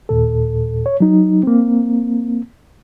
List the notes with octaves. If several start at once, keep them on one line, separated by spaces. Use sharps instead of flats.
D#2 A#2 A4
C#5
F#3 D#4
A#3 C4